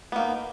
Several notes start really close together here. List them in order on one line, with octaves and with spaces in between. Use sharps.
B3 A#3 D#4